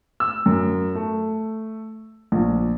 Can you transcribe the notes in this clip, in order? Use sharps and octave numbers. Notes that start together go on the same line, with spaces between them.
E6
F#2
A3
A#1